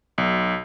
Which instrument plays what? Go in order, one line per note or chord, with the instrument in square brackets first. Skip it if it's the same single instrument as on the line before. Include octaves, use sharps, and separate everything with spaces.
[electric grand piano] B1